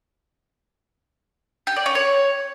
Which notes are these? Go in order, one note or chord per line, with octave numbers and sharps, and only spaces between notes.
G4
D5
C#4
C#5